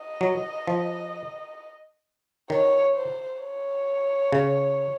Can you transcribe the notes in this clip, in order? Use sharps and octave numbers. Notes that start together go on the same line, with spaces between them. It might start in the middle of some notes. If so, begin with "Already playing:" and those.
Already playing: D#5
F#3
F3
D#3 C#5
C5
C#5
C#3